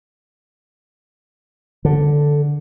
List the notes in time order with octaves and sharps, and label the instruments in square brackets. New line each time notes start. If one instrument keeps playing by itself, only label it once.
[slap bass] D3